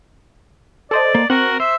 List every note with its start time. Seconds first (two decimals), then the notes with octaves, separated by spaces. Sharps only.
0.91 A4 C5 D5 D#5
1.15 A#3
1.30 C4 F#4 A#4 F#5
1.60 C5 E5